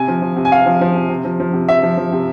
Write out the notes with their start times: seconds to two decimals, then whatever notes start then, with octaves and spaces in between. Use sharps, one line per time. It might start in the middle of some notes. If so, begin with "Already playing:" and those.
Already playing: C3 G#5
0.08 F3
0.22 F3
0.36 C3
0.45 G#5
0.51 C3 F5
0.66 F3
0.81 F3
0.96 C3
1.09 C3
1.25 F3
1.40 F3
1.53 C3
1.69 C3 E5
1.83 F3
1.97 F3
2.12 C3